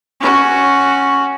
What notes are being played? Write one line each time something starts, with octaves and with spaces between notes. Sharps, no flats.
C#4 F#4